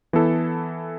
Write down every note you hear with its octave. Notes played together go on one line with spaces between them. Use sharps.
E3 B3 E4 A4